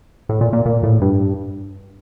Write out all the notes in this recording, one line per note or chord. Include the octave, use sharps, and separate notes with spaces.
A2
A#2
A#2
A#2
A2
G2